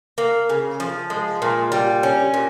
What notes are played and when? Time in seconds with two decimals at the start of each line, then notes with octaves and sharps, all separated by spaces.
0.18 A#3
0.49 C#3
0.80 F3
1.10 G#3
1.42 A#2
1.72 G3
2.03 C#4
2.34 A#2